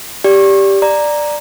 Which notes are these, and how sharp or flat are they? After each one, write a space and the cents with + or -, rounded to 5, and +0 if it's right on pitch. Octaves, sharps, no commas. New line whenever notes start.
G4 +0 D5 -20
D5 +10 A#5 +0